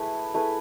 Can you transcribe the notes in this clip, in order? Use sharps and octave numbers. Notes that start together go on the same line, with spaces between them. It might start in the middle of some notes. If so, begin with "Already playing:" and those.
Already playing: A3 E4 G#4 B4
A3 E4 G#4 B4